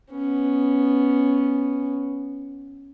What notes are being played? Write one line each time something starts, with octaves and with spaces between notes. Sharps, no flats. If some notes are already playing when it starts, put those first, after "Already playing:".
B3 C#4